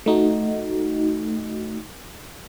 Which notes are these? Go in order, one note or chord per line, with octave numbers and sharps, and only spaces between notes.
A3 D#4 F#4